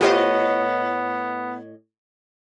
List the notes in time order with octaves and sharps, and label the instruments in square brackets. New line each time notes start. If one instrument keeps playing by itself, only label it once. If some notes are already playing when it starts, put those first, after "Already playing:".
[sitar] A2 C#5 D#5 [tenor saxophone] B3 [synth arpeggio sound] F4 G4 C5